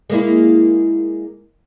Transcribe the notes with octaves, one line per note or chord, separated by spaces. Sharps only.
G#3 A#3 E4